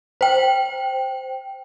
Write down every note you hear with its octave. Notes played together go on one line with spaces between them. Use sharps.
C5 G5